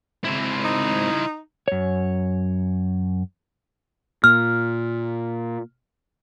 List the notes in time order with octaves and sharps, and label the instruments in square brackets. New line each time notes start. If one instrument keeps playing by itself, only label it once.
[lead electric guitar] G#2 C4 [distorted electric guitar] E4 C5
[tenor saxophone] D#4
[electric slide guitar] F#2 C#5
[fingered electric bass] A#2 [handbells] F6